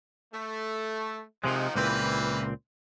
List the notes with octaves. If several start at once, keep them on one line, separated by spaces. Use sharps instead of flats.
A3
C3 D#3 F3 G#3 D#4
C#2 A#2 E3 A#3 C4 B4